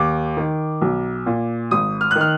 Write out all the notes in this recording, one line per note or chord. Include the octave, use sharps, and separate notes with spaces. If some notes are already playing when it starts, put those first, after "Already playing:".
Already playing: D#2 D6
D#3
B1
A#2
G#1 D#6
F6
D#3 F#6
F6